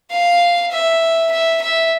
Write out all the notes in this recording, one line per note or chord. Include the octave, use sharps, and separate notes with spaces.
F5
E5
E5
E5